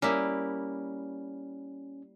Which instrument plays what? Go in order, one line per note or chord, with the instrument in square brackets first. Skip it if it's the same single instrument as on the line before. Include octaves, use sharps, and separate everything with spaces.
[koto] G3 A#3 E4 [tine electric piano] C#4